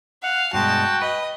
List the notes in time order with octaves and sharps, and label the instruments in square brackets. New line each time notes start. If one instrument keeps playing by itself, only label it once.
[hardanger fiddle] F5 [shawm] F#5
[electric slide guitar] G2 B2 G#3 [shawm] F#4 [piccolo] G5 [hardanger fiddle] A5
[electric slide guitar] B4 [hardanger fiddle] D#5